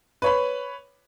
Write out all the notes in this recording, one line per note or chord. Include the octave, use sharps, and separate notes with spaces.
B4 C#5 B5